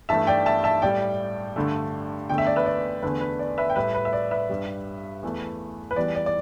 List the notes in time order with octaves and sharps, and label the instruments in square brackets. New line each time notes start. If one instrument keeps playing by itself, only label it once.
[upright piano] G2 E3 A3 E5 A5
D5 G5
E5 A5
E5 A5
A2 G3 D5 G5
G2 D3 A3
E2 D3 A3 G5
E5
D5
B4 E5
D5
E2 D3 A3 B4
B4
D5
B4 E5
G5
A2 G3 B4 E5
B4
E5
D5
B4 E5
G2 G3
E2 E3 A3
B4
E2 E3 G3 D5
D5
D5